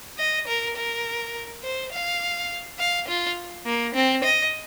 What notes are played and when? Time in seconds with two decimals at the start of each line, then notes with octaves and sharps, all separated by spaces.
0.18 D#5
0.47 A#4
0.76 A#4
1.63 C5
1.92 F5
2.79 F5
3.08 F4
3.66 A#3
3.95 C4
4.24 D#5